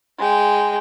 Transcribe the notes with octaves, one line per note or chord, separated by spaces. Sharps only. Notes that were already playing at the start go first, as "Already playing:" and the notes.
G#3 G5